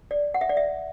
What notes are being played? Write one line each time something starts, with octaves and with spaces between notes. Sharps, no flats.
D5
F#5
E5
D5
E5